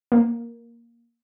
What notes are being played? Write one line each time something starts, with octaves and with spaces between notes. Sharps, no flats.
A#3